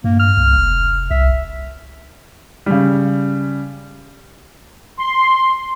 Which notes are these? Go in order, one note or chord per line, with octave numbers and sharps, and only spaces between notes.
G2 A#3
F6
C2
F1
C2 E5
C#3 G3
C6